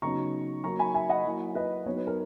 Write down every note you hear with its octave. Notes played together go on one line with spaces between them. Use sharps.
C#3 F#3 B3 D#4 A#5 C#6
F#3 A#3 D#4 A#5 C#6
G#5 B5
E5 G#5
D#5 F#5
F#3 A#3 E4
B4 D#5
F#3 B3 D#4 C#5
B4
A#4